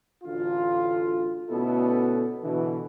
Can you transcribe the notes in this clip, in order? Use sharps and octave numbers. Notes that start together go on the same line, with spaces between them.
A1 D2 D3 F4
D2 B2 B3 C#4 E4 A4
B2 D3 E3